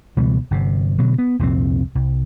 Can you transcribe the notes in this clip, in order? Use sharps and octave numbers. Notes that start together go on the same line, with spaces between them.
C#2 B2 E3 G3
G1 C3
B2 D3 F#3
B3
C2 F2 A#2 C4
C2